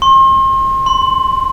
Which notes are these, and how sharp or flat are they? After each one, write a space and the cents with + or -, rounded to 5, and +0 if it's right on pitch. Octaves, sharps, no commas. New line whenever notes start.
C6 +40
C6 +0